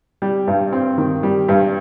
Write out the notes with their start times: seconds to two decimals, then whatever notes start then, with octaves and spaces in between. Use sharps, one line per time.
0.22 G3
0.48 G2
0.73 C4
0.98 D#3
1.23 G3
1.49 G2